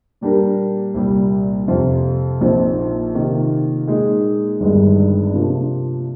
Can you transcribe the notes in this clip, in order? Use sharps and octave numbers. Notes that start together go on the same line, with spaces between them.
A#2 G3 D4 G4 A#4
C2 A#2 G3
F2 C3 F3 C4 F4
A#1 A#2 F3 C4 D#4
C3 D#3 A#3 F4
A#2 G#3 D#4 G#4
G1 G2 D#3 G#3
C3 F3 A#3 D4